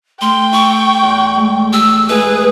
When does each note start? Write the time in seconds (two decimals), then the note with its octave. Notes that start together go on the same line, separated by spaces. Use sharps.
0.21 A3 G5 C6 F6
0.52 E4 C#6
1.03 E2 F#6 G6
1.37 G#3 A3
1.73 G4 E6
2.09 G#3 A3 E4 G#4 B4